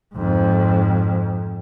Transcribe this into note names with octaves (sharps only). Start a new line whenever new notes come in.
F2 G#2